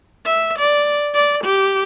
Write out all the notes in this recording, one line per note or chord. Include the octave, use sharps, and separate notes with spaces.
E5
D5
D5
G4